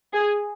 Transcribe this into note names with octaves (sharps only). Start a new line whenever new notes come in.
G#4